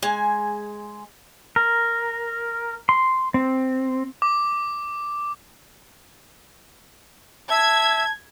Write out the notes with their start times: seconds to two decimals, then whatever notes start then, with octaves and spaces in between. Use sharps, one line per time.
0.03 G#3 G#5
1.56 A#4
2.89 C6
3.34 C4
4.22 D6
7.50 E5 A5 G#6